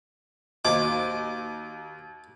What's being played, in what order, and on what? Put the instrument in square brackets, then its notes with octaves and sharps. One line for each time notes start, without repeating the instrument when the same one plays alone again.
[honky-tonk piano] D#2 [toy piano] F#4 C5 D#5 [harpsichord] D6